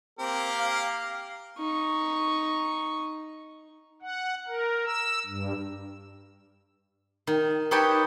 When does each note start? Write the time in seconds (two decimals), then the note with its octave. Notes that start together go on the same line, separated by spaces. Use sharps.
0.19 A#3 C4 G4 A#4
0.59 F5
1.58 D#4 C#6
4.02 F#5
4.48 A#4
4.86 E6
5.26 G2
7.27 D#3
7.71 D#4 G4 B4 C#5 G5 A5